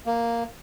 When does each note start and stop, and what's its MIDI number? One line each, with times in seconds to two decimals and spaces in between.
0.06 0.44 58